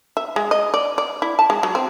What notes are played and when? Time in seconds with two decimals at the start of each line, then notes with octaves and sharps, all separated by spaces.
0.17 E5
0.36 G#3
0.51 D#5
0.74 D5
0.98 D5
1.22 E4
1.39 A5
1.50 G#3
1.63 F#3
1.75 C4